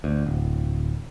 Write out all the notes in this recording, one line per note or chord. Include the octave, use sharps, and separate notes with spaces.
D2
D1